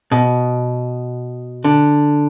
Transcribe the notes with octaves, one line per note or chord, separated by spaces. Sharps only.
B2
D3